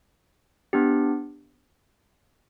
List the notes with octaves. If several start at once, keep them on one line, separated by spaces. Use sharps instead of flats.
B3 D4 G4